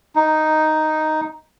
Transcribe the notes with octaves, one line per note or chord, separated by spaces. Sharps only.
D#4